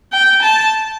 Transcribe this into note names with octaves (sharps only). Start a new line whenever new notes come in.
G5
A5